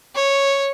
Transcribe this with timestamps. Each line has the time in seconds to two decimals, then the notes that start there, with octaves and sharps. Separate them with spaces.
0.15 C#5